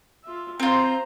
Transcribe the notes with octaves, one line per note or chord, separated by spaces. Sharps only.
F4 E5
C4 F4 C5 A#5